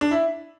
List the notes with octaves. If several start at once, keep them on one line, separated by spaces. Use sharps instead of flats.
D4
E4